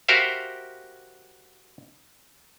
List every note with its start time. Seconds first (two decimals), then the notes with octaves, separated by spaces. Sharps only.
0.08 F#4 G4 A#4 C5 E5 F5